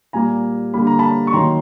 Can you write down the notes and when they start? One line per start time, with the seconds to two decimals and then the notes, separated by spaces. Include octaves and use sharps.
0.13 A#2 G3 A#3 G#5 A#5
0.74 D3 G3 A#3 B5
0.87 A#5
0.99 A5 B5
1.27 C#6
1.33 D#3 F#3 A#3 A#5 C6